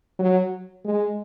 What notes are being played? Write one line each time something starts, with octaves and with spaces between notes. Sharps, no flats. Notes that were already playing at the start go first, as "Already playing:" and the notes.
F#3
G#3